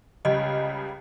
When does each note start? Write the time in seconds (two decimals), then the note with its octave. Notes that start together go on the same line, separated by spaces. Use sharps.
0.25 C#2 C#3 G3 D#5